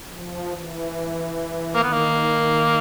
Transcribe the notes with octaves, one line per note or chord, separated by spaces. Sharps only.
F3
E3
D#3 A#3
B3
A#3